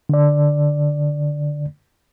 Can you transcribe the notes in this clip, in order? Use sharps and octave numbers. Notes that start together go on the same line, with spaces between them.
D3 D5